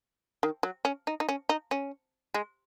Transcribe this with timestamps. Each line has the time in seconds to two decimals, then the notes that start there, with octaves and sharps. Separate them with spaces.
0.43 D#3
0.63 F#3
0.85 C#4
1.07 D#4
1.20 D#4
1.29 C#4
1.49 D#4
1.71 C#4
2.34 G#3